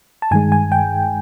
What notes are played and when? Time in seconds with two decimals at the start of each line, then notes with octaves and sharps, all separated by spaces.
0.22 A5
0.31 G2 D#3 G#3 G#5
0.52 G#5
0.72 G5